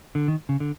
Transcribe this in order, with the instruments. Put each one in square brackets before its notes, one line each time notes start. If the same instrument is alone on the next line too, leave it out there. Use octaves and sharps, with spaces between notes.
[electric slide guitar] D3
D#3
C#3
D3